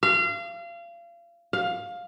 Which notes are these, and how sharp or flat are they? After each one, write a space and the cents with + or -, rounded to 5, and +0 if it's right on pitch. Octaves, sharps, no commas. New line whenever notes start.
F5 -30
F5 +15